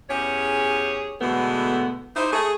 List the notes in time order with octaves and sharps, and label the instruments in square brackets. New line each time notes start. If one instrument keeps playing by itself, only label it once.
[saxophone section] E2 C#4 G4 G#4 C#5
B2 D3 E3 G#3 A3 B3
D#4 E4 G4 C5
A3 G#4